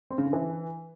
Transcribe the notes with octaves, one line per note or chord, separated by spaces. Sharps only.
C4
C#3
D3
E3